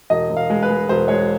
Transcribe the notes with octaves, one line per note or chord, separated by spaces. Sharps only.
E1 D#5
E1
F5
G#3
B4
G#3
E1 C5
G#3 C#5